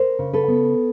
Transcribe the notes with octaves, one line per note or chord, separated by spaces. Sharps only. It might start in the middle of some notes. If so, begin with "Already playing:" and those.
Already playing: A#4 C5
C#3
A4 B4
B3